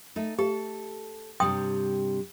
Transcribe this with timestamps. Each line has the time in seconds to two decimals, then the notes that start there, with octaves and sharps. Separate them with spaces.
0.16 A3 D#4
0.39 G4 A4
1.40 G2 C3 G3 G5 C6 D#6